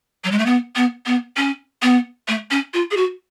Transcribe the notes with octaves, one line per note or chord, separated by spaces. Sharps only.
F#3
G#3
A3
B3
B3
B3
C#4
B3
A3
C#4
F4
G#4
F#4